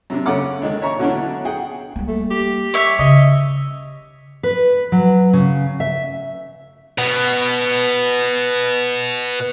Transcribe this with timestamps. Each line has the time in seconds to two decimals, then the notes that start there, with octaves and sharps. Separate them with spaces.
0.10 F#2 C3 D4
0.26 C#3 C#4 A4 F#5 D6
0.62 D#3 G#3 D4
0.82 C#5 E5 A#5 C#6
0.99 B2 D3 F#3 C#4 D4 E4
1.45 G#4 F#5 G5
1.96 G3 A#3
2.08 A3
2.30 G4
2.74 C#5 E5
2.99 C#3 D#5
4.43 B4
4.92 F#3
5.33 C#3
5.80 E5
6.98 B2 B3